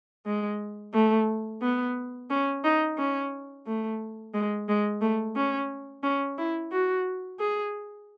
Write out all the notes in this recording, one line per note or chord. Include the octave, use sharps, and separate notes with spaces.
G#3
A3
B3
C#4
D#4
C#4
A3
G#3
G#3
A3
C#4
C#4
E4
F#4
G#4